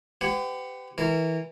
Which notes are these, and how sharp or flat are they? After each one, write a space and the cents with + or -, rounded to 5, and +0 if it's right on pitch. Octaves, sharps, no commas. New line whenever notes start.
G4 +0 B4 +45 F#5 +5
E3 -20 A#4 -25